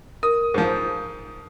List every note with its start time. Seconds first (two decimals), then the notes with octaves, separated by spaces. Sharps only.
0.23 A#4 D#6
0.54 G#2 F3